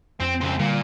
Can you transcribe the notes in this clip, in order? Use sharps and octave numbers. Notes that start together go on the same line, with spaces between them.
F2 C4
C#2 C4
A#2 D3 G3